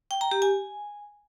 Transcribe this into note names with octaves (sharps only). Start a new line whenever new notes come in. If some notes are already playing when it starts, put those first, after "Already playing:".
G5
A#5
G4
G#5